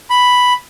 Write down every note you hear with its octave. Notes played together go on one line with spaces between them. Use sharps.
B5